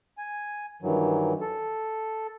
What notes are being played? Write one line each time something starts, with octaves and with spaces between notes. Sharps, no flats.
G#5
G2 D#3 E3 F#3
A4